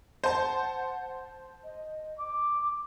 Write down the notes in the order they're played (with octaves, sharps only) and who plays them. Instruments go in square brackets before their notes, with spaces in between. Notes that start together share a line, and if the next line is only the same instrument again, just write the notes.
[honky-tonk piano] C5 A5 [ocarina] F#5
[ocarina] D#5
D6